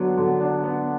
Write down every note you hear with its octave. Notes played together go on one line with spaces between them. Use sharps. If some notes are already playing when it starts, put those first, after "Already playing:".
Already playing: D3 F#3 B3 D4
D3
D4
B3